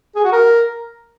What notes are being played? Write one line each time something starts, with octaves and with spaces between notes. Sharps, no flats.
G#4
F#4
A#4